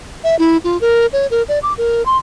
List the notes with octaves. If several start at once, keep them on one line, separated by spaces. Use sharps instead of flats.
E5
E4
F4
A#4
C#5
A#4
D5
D6
A#4
C6